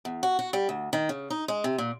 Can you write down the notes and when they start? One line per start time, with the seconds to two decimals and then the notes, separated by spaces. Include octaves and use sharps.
0.05 E2
0.23 F#4
0.39 F#4
0.53 G3
0.69 D2
0.93 D#3
1.09 C#3
1.30 D#4
1.48 G#3
1.64 C3
1.78 A#2